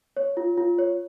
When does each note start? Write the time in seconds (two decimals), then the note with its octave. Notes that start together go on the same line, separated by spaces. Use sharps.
0.17 C#5
0.37 F4
0.57 F4
0.79 C#5